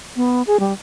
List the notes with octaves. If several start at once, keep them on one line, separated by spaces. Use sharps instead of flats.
B3
G#4
G3